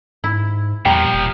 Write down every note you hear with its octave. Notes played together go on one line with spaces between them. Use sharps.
G#2 E4
E2 A#2 F3 G3 G5 A#5
E1